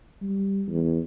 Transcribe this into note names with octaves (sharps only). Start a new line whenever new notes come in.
G3
E2